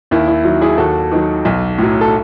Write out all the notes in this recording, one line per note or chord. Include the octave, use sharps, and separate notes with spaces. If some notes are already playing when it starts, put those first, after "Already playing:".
D#2 E4
E4
D#3 F#3 E4
E4 G#4
D#2 F#4 A4
D#3 F#3
B1
A2 F#3
A4